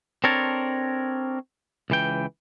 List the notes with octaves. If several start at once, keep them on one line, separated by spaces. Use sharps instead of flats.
C4 D4 A4 A#4 C#5 A5
C#2 E3 G5